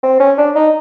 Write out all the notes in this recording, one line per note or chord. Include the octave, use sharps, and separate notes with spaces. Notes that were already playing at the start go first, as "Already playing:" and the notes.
C4
C#4
D4
D#4